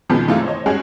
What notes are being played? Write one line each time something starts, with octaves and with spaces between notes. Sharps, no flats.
B2 D#3 F3 G#3 B3 C#4
F#2 C3 E3 G#3 A3 F4
C5 C#5 D#5
G3 G#3 C#4 F#4 G#4 C#5